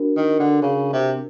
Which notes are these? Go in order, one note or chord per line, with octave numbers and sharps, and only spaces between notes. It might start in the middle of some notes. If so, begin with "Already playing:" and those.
Already playing: D4 F#4 A#4
D#3
D3
C#3
C3